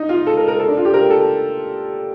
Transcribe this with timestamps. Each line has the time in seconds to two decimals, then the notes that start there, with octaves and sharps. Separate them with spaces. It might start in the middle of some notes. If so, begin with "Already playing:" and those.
Already playing: D#4
0.09 F4
0.27 A4
0.37 A#4
0.48 A#4
0.60 A4
0.68 D4
0.77 F4
0.85 G4
0.94 A#4
1.10 A4